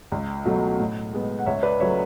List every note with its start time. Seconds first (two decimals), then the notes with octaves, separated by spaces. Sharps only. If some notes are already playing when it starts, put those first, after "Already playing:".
0.12 C#2
0.45 B2 F#3 A3
0.80 A2
1.13 G#3 B3
1.39 F#5
1.46 C#2 C#5 E5
1.63 B4 D5
1.80 C#3 F#3 A3 C#5 E5